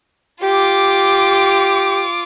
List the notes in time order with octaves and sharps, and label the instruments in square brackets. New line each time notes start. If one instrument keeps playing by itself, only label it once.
[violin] F4 D6 [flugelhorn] G4